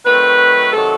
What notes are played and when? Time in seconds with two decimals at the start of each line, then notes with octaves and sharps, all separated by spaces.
0.05 D#3 F#3 A3 C4 B4
0.73 C3 D#3 F#3 A4